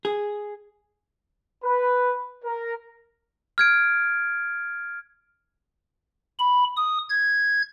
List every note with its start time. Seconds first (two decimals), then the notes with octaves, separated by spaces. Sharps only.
0.05 G#4
1.64 B4
2.44 A#4
3.58 F6 G#6 D7
6.39 B5
6.77 D#6
7.09 G#6